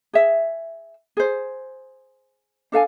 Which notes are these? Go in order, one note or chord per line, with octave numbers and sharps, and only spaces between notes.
G#4 E5
G#4 C5
D4 A4 F5 G#5